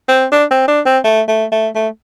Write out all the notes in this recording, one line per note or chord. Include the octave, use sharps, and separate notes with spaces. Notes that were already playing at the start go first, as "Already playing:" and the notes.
C4
D4
C4
D4
C4
A3
A3
A3
A3